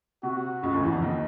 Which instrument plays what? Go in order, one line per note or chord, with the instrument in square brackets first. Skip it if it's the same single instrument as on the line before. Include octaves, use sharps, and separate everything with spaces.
[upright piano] C3 [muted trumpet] F#4
[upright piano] C#2 C#3
D2 D3
E2 E3
F2 F3
D#2 D#3